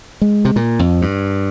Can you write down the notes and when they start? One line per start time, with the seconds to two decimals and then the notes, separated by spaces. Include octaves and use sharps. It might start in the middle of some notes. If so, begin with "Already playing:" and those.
0.21 G#3
0.45 C3
0.56 A#2
0.79 F2
1.02 G2